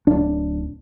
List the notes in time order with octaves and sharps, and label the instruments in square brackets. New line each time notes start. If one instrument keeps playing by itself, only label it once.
[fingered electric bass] D1 D4